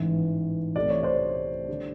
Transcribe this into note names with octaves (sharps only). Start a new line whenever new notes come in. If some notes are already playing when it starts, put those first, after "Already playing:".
Already playing: A1 G#2 E3
C2 C3 E3 A3 D5
C#5
C5 D5
D3 G3